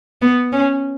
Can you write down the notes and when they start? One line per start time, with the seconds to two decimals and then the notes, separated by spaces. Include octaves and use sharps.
0.22 B3
0.52 C#4